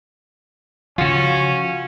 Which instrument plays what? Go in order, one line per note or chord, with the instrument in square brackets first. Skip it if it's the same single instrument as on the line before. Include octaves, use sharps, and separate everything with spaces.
[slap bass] C#3 F3 [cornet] C#4 [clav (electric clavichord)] F4 F#4